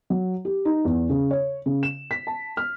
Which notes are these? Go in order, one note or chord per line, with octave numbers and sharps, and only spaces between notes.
F#3
G4
D#4
E2
C#3
C#5
C#3
E7
B6
A5
F6